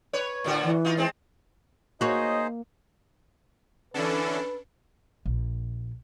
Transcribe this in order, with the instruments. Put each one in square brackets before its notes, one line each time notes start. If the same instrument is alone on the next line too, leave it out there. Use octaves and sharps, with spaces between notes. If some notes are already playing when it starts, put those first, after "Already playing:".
[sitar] B4 C#5
A2 D3 F#4
[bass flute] E3
[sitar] D#4 F4
G#3 C4
[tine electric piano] A#3 [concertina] D#4 G#4 C5 [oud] F#4 C#5 [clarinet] D#5
[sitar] D3 E3 [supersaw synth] C#4 D4 A4 [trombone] B4
[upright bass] A#1